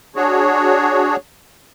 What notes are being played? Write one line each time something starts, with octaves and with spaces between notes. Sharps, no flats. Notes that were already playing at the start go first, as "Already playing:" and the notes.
D4 F#4 G#4 C#5